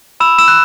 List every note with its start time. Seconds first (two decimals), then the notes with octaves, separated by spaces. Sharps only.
0.20 B5 E6 E7
0.39 E6 E7
0.48 F#6